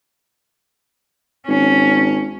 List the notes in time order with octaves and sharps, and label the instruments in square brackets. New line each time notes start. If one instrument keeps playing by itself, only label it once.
[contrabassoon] G#1 [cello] C#4